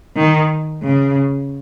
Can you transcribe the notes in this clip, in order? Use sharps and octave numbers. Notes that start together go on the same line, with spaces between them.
D#3
C#3